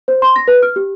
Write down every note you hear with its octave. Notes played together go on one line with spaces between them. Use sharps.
C5
C6
A#6
B4
F6
G4